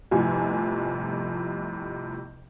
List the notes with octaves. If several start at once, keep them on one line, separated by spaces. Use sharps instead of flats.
G1 F2 A2 C3 G#5